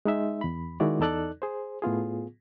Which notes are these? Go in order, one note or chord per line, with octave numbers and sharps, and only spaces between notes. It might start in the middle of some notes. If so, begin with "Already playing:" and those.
G#3 D#4 E5
E2 B5
D#3 G#3 E4 F#4 D5
E2 D#4 A4 D5 F#6
G#4 C5
A2 B3 F4 G#4